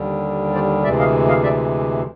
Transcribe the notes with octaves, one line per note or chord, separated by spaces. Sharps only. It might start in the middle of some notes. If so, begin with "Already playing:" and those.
Already playing: D#2 D3 G3
C5 D5
D2 C3 E3 G#3 D5 E5
D#5 F5
D#5 F5
D5 E5